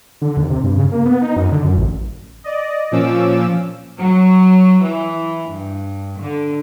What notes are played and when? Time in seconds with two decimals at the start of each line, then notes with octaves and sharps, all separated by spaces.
0.22 D3
0.37 D#2
0.50 C3
0.63 G2
0.76 C#3
0.91 A#3
1.05 B3
1.22 D#4
1.36 F#2
1.52 D3
1.65 F#2
1.77 A1
2.44 D5 D#5
2.91 A#2 F3 C#4 D6 E6
3.99 F#3
4.85 E3
5.51 G2
6.20 D3